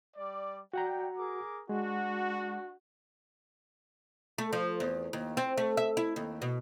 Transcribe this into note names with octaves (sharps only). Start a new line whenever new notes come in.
G3 D5
F#4 D5 F#5 G5 A#5
G#4 A#4 D6
G#3 D4 F#4
A3
F3
E2
D#2
C4
A3
E5
E4
D#2
B2